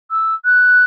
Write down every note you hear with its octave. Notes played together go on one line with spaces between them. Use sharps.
E6
F#6